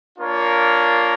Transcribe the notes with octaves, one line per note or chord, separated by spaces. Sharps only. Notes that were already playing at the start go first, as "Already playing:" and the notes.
A#3 D4 F4 A#4 C#5